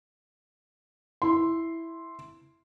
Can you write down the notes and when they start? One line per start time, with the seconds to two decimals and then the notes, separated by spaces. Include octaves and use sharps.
1.22 E4 C6